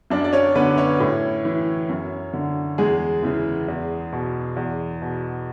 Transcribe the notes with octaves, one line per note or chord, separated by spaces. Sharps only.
F#2 D4 D5
D5
C#4 C#5
D3 B3 B4
C#4 C#5
A2
E3
F#2
D3
E2 G#3 G#4
C#3 E3
E2
B2
E2
B2